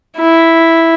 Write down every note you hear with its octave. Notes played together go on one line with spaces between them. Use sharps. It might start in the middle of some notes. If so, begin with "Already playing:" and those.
E4